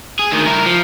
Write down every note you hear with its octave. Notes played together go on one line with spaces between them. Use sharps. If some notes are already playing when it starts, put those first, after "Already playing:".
G#4
D2 D#3
E4 A#4
F3